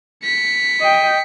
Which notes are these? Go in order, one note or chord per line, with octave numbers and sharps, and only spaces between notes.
B6 C#7
D#5 G5